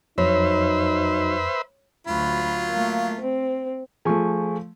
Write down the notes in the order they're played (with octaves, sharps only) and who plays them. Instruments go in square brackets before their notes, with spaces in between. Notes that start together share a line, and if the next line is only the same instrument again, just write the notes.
[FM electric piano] F2 [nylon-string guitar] F#3 [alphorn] D#4 [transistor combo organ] B4 C5 E5
[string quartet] D2 B5 [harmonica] F#3 F4
[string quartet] A3 A#3
C4
[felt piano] F3 A3 [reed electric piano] G#4 G#5 C#6